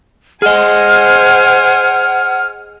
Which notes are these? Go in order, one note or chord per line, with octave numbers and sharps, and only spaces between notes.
G#4 C5 D#5 F#5 G#5 F6